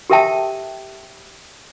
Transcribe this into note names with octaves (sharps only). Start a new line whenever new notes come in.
G4 A4 A#4 E5 G5 A5